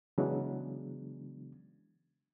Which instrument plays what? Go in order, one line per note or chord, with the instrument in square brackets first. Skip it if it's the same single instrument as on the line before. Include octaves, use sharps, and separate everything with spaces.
[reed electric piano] C#3 E3 F#3 G#3 B3 D4